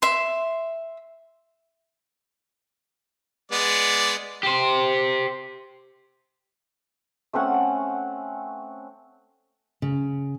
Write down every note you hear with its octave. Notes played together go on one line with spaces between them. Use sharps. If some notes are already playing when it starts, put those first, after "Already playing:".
E5 C6
G#3 B3 D5
G4 C5
A3 C4 C#4 F#5
C#3